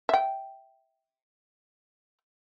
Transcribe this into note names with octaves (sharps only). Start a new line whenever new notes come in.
E5 G5